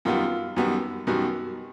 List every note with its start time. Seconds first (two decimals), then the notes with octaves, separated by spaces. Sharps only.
0.05 F#2 D#3 G3 B3 F4
0.56 F#2 D#3 G3 B3
1.07 F#2 D#3 G3 B3 F#4